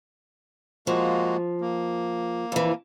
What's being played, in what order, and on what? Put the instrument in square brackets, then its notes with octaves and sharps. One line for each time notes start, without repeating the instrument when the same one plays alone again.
[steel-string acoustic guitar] F3 [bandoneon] G#3 A#3 F#4
[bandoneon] A#3
[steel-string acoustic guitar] F2 E3